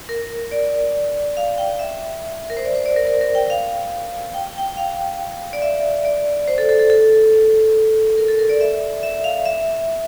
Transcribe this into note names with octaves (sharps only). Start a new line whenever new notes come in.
A#4
D5
F5
G5
E5
A#4
C5
D5
C5
D5
A#4
A#4
A#4
G5
F5
G5
G5
F5
D5
E5
D5
C5
A4
A4
A4
A4
A#4
A4
A#4
D5
E5
E5
F5
E5